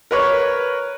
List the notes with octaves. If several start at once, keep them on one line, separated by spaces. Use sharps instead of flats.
A#4 B4 C#5